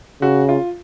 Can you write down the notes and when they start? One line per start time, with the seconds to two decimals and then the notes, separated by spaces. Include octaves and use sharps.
0.21 C#3 F#4
0.49 F4